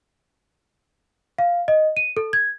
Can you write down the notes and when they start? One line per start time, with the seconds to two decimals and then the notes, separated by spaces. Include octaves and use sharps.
1.38 F5
1.68 D#5
1.97 D#7
2.17 A4
2.33 G#6